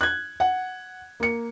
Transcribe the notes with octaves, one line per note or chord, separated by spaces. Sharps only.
F#6 G#6
F#5
A#3 C#7